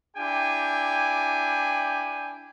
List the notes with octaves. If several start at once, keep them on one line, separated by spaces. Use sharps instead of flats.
D4 E4 G4 G5 G#5